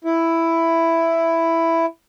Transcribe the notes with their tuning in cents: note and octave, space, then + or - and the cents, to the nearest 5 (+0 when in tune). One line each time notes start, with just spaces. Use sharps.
E4 +5